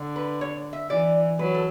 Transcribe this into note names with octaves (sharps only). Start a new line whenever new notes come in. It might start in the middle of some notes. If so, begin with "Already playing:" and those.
Already playing: D3
B4
C#5
E5
E3 D5
F#3 B4
A4